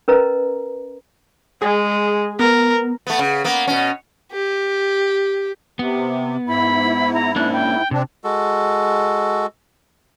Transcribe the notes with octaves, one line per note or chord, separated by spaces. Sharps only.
C#4 A#4 B4 D#5 A#5
G#3 G#4
B3 A#4
A3 B3
C#3
A#3 B3
B2 C#4
G4
C3 B3
G#2 E4 B5
A#5
A#3 C#4 D4 F#6
G5
C3 C4 D4
G#3 F#4 A4